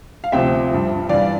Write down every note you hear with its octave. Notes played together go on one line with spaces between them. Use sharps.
F5
D2 C3 F3 E5 G5
G2 F3
G2 E3 D5 F5